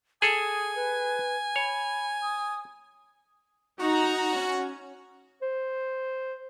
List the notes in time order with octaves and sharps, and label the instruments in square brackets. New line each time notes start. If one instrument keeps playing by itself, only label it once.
[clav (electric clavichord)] G#4 A4 [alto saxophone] G#5 [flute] D#6
[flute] B4
[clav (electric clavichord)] C#5 [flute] B5
[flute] D#6
[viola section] D#4 A#5 [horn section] F#4
[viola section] C#4
[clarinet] C5